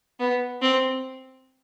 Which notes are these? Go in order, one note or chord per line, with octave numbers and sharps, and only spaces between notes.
B3
C4